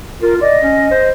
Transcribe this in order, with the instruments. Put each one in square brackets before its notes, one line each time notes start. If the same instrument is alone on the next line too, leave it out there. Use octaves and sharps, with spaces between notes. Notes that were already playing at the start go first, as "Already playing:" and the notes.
[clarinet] F4 [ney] A#4
[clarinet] D5 [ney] D#5
[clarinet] C#4
C5